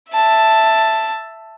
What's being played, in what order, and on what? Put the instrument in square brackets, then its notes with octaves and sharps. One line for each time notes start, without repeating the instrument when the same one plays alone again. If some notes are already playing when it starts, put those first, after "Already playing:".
[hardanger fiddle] E5 A5